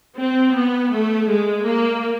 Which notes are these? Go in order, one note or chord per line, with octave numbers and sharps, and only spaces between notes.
C4
B3
A3
G#3
A#3